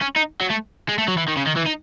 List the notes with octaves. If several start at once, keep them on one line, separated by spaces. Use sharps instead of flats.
C#4
D#4
F#3
A3
G#3
A3
F#3
E3
D#3
C#3
D#3
E3
D#4